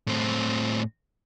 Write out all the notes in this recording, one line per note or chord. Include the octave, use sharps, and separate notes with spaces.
A2 C4